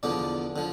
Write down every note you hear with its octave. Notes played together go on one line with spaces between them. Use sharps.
E2 D3 F3 D5
D3 F3